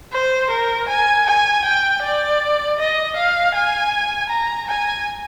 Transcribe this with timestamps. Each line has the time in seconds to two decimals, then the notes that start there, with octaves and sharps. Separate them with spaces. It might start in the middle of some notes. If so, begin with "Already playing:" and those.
0.13 C5
0.51 A#4
0.89 G#5
1.27 G#5
1.65 G5
2.03 D5
2.79 D#5
3.17 F5
3.55 G#5
4.30 A#5
4.68 G#5